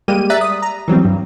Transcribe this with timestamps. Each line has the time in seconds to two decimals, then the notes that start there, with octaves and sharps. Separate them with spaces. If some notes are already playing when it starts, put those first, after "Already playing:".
0.08 G3 G#3 A#3 G4 D#7
0.30 D5 E5 A#5 F#6 A6 B6
0.41 D#6
0.62 A#5
0.88 E3 F#3 G3 C4
1.05 G2